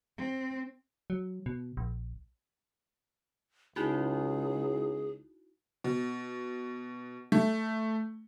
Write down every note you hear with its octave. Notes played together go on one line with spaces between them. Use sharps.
C4
F#3
B2
A#1
C#2 D#4 E4 F#4 G#4
B2
A3